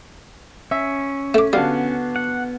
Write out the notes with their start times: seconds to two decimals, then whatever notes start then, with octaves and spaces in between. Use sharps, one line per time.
0.71 C#4 E5
1.34 A3 D6
1.53 D3 G3 B3 F#4 F5
2.16 F#5